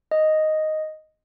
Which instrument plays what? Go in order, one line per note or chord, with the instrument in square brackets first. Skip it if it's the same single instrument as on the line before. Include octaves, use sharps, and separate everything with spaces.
[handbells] D#5